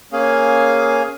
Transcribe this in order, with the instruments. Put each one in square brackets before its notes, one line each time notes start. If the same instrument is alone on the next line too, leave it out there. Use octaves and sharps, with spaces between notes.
[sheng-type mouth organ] A#3 C#4 G#4 F5 G#5